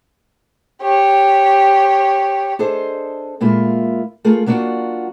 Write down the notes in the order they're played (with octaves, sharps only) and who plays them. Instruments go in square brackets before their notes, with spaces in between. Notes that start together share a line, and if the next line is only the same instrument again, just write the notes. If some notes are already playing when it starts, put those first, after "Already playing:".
[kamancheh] G4 C#5
[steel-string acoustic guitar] D4 G#4 A4 C5 D#5
A#2 G#3 A#3 E4 F4
A3 F4 G#4 A#4
F#3 A#3 D4 F4 F#4